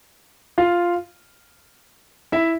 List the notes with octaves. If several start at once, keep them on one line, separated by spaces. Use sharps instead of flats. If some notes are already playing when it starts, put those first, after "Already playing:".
F4 F5
E4 E5